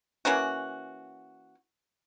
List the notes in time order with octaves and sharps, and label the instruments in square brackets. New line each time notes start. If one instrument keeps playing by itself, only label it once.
[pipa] E3 A#3 C#4 F#4